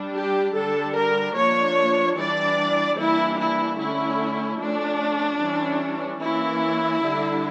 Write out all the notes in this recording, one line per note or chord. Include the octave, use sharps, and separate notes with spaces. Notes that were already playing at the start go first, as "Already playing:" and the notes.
Already playing: G3 D4
G4
D3 G3 D4 A4
A#4
F3 A#3 D4 C#5
E3 G3 D4 D5
E3 G3 A#3 D4 E4
E4
D3 A3 C#4 E4
F3 A3 C#4 D4
E3 G3 C#4
E3 A#3 C#4 E4
D3 G3 D4